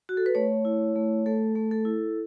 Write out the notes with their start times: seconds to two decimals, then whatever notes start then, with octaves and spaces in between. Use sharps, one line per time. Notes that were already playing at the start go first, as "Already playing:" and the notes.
0.09 F#4
0.17 A4
0.26 B4
0.35 A3 C#5
0.65 E4
0.96 A3
1.26 A3 A4
1.55 A3
1.71 A4
1.85 E4